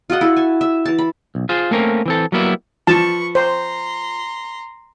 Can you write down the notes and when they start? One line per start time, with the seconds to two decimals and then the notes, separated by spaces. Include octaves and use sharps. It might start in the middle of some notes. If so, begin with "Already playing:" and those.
0.10 F4 F#4 D#5 F#5
0.21 E4 A4
0.36 G#5 A5
0.61 E5
0.86 E3 A5
0.99 B5
1.35 B1
1.49 F4 G#4 C5
1.71 A3 A#3 C4 C#4 A#4
2.06 E3 C4 A4
2.32 F#3 G3 A#3 B3 E4
2.87 F3 B4 A5 C#6
3.35 C5 A#5 C6